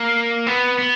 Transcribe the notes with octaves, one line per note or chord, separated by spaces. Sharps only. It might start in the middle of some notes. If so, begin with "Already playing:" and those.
Already playing: A#3
B3
B3